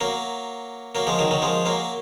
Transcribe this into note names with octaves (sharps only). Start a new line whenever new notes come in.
F#3 A#3
F#3 A#3
F3 G#3
D#3 F#3
D#3 F#3
F3 G#3
F#3 A#3